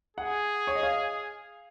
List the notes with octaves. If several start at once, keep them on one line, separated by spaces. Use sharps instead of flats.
G#4 F#5
C#5
D#5
F5